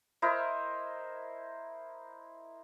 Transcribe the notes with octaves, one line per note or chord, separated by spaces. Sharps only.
E4 A#4 C5 D#5